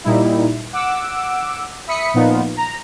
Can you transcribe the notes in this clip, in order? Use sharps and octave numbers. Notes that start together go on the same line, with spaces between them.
A#2 G3 D#4 E4
F#5 D6 E6
E5 B5 D#6 B6 C#7
A#2 F3 B3 D#4 F4
A#5